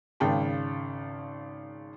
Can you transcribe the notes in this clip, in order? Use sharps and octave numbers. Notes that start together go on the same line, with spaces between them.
G#1 C#3 G5 A5